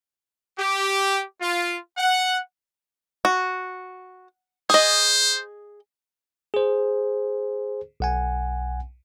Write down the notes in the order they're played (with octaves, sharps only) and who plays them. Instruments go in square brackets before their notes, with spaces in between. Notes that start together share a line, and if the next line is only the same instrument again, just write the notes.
[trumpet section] G4
F4
F#5
[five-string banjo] F#4
[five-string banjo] G#4 D#5 [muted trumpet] C5
[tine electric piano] G#4 C5
B1 F#5 G#5